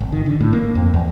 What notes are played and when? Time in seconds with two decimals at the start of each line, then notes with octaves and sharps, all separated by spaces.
0.01 G#1
0.12 D#3
0.26 D3
0.41 A2
0.53 A#3
0.75 F2
0.94 E2